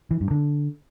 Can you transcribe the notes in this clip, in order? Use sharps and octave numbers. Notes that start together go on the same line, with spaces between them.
E3
G2
D3